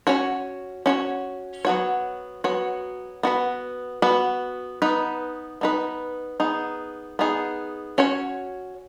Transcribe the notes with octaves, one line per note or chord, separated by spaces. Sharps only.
C#4 F#4 C#5
C#4 F#4 C#5
F#3 B3 F#4 C#5
F#3 B3 F#4 C#5
B3 F#4 B4
B3 F#4 B4
B3 D#4 B4
B3 D#4 B4
B3 D#4 G#4
B3 D#4 G#4
C#4 F#4 C#5